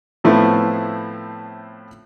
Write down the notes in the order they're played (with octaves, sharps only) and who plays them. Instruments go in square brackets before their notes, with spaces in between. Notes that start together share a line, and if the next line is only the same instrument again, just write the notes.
[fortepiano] A2 F3 A3 B3 C4 E4